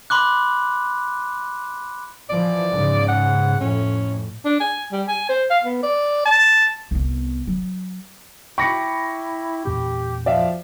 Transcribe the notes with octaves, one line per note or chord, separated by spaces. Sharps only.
B5 C6 D6 F#6
E3 F3 D5
G#2 C#3
F#5
F2 A2 C#4
D4
G#5
G3
G#5
C5
F5
B3
D5
A5
C2 B3
F#3
E4 G5 B5 C#6 D6 A#6 C#7
E2 A#2 C#4 G4
F3 D5 E5 F5